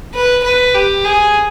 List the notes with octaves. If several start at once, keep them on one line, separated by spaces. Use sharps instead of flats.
B4
B4
G4
G#4